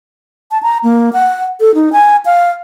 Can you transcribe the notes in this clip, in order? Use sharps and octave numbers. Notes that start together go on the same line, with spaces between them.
A5
A#5
A#3
F#5
A4
D#4
G#5
F5